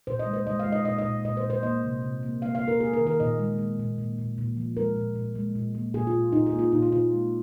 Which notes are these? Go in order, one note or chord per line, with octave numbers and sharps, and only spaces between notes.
A#2 C5
D#5
G#3
C5
G#3 D#5
F5
G#3
D#5
A#2 D#5
D#5
A#2
A#2 D#5
C5
A#2
C5
A#3 D#5
C3
C3
A#3
A#3 F5
F5
A#3
A#4
A#3 G#4
A#4
D#3
A#4
A#2 D#5
G#3
G#3
A#2
A#2
A#2
A#2
F3
G#3 A#4
A#2
A#2
G#3
A#2
A#3
A#2 G#4
F4
A#2
A#2 D#4
G#4
A#3
F4
A#2 D#4
F4
A#2 F4
G#3